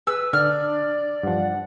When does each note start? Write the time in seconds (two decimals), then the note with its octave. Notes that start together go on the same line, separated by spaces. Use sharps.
0.07 G#4 B4 E6
0.33 D3 D4 D5 F6
1.23 G2 F3 F#5